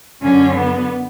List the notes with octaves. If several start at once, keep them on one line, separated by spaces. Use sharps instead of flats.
F#2 D3 F#3 C#4
B3